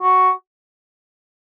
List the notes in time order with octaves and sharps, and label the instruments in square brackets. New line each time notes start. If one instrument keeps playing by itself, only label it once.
[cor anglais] F#4